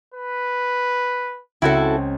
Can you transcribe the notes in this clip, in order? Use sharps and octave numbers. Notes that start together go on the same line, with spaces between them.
B4
C#2 C4 E4 F#4 A4 G#6